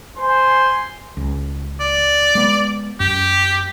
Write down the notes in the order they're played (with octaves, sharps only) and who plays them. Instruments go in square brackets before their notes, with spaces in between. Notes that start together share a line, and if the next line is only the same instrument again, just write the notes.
[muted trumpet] C5 [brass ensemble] G#5 [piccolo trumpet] C6
[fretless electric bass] C#2
[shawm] D5
[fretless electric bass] G#3 B3
[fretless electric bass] F#2 [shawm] G4